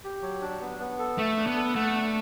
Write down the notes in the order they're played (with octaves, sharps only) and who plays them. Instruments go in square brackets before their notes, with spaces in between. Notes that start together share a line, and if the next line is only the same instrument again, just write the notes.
[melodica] G4
F#3
D4
B3
B3
A4
[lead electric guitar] A3 [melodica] E5
[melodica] D4
[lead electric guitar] B3
[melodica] A4
[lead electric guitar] A3 [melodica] F#5
[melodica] D4